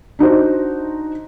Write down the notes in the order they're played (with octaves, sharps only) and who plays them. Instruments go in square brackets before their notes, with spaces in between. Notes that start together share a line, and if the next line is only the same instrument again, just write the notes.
[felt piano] D4 D#4 F#4 C5